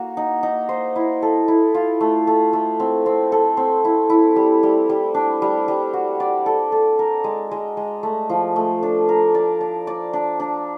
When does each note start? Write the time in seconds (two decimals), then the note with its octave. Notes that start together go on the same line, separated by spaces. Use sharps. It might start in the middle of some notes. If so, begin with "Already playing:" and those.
Already playing: A#3 F#4
0.17 D#4
0.43 D#4
0.69 C5
0.96 E4
1.22 A4
1.48 E4
1.75 F4
2.01 A3
2.27 A3
2.53 A3
2.80 C4
3.06 C4
3.32 A4
3.57 C4
3.85 E4
4.10 E4
4.36 G3
4.63 G3
4.89 G3
5.14 D4
5.42 G3
5.68 G3
5.93 F#4
6.20 D5
6.46 A4
6.72 A4
6.99 A#4
7.24 G#3
7.51 G#3
7.77 G#3
8.03 A3
8.30 F3
8.56 A3
8.83 D4
9.09 A#4
9.35 D5
9.61 D5
9.87 D5
10.13 D4
10.40 D4